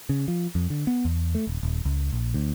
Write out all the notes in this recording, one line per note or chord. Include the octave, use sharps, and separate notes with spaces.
C#3
F3
F2
D3
B3
E2
A3
D#1
D#1
C#2
A#1
D2